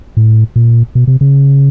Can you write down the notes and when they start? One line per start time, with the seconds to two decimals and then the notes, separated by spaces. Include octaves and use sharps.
0.17 A2
0.56 A#2
0.95 B2
1.07 C3
1.21 C#3